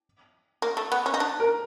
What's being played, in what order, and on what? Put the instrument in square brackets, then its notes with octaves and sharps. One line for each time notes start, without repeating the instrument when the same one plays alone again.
[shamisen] A#3
A3
B3
C#4
D#4
D4
[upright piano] A#4